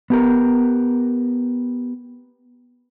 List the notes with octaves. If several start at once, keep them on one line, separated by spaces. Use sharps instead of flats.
B3 G4 A#4